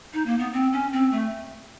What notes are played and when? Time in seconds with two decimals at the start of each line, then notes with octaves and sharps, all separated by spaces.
0.14 D#4
0.26 A#3
0.39 B3
0.53 C4
0.73 C#4
0.93 C4
1.12 A3